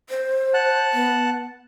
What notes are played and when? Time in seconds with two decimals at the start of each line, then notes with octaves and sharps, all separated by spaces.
0.10 C5
0.54 F#5 A5 F#6
0.93 B3